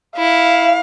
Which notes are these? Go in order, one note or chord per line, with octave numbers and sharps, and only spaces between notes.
E4 F5